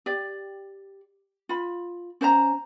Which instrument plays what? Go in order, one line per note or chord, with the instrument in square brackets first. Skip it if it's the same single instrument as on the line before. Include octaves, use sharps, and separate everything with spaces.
[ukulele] G4 D5
F4 B5
C#4 C5 D5 A#5